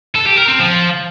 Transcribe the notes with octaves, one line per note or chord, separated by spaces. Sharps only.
A4
G4
A#4
C4
F3